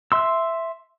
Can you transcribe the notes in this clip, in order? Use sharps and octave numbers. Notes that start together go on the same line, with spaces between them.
E5 C6 E6